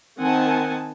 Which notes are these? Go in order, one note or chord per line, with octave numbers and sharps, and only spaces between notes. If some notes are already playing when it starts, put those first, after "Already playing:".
D#3 C4 F#5 G#5 A5